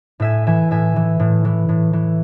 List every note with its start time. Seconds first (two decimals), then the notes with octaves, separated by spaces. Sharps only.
0.20 A2 E5 G#5
0.47 E3 E5 G#5
0.71 A2 E5 G#5
0.96 E3
1.20 A2
1.45 E3
1.69 A2
1.93 E3